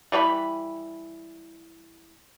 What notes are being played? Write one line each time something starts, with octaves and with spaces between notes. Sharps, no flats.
E3 G3 C#5 B5